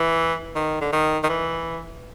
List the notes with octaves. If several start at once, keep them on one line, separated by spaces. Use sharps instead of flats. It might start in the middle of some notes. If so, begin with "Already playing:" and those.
Already playing: E3
D#3
D3
D#3
D#3
E3